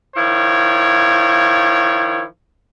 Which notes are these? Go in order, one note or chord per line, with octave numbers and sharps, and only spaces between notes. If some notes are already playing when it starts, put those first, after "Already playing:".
D#3 F3 E4 C#5